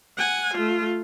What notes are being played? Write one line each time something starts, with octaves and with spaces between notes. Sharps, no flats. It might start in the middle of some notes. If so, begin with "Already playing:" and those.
F#5 G#5
A3 F4